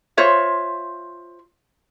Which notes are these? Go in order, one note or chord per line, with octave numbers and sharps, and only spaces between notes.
F4 C5 C#5 E5